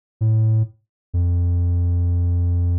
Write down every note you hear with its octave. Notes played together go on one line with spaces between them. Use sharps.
A2
F2